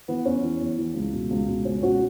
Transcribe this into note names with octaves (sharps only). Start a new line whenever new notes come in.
E3 B3
E2 C#4
E3
E2
E3
C#2
B2
C#2
B2
C#2 C#4
B2 C#4 F#4